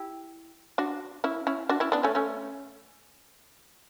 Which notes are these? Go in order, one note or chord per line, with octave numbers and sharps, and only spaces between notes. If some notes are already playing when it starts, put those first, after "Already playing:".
Already playing: E4 G4
D4 F#4
C#4 E4
C#4 E4
D4 F#4
C#4 E4
B3 D4
A3 C#4
A3 C#4